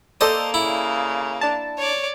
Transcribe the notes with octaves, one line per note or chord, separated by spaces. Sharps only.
A#3 A4 C5 D5 D#5
C#3 E4
D4 A5
C#5 D5